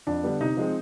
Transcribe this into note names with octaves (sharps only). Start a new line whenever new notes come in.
F2 D4
D3 G3 B3
C3 D#4
F3 G#3 C4